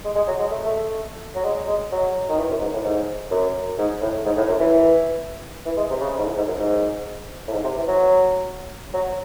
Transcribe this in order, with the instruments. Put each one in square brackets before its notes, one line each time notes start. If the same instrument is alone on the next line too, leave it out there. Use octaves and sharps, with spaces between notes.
[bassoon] G#3
G#3
F#3
G#3
A3
A3
F#3
G#3
G#3
F#3
D#3
E3
F#2
G#2
A2
G#2
F#2
G#2
A2
G#2
A2
F#2
E3
E3
G#3
C3
C#3
C3
G#2
A2
G#2
F#2
G#2
A2
G#2
C3
E3
F#3
F#3